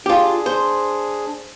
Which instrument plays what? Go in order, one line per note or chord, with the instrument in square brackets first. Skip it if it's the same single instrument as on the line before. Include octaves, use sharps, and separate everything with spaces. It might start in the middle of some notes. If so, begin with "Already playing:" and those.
[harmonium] D4 G#4 [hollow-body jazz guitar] F4 G4
[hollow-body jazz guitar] C5